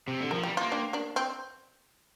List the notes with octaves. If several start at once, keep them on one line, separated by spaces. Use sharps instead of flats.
C3
D3
F3 A#4
G3 G4
A#3 F4
D4 G4
A#3 D4
C4